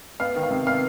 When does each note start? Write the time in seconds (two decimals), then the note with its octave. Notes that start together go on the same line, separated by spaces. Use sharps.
0.20 B3 F5
0.36 D#3
0.43 F5
0.51 C3
0.66 B3 F5